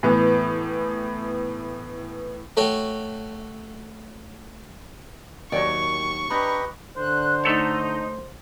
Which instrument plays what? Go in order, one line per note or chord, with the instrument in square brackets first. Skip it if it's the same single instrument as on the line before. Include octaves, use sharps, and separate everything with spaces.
[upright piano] A2 E3 B3
[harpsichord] A3 F#4 A4 C#5 G5
[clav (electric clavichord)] D#2 D#3 F#3 [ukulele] F#4 C#5 D5 [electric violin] C#6
[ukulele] D4 A#5 B5 [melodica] G4 B4 D#5
[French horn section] D3 [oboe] C5 [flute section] F#6
[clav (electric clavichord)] A3 A4 C#5 [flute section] D#4